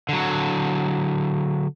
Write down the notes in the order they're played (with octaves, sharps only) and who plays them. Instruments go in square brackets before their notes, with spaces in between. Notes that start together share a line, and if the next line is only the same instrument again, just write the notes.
[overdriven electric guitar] D3 F#3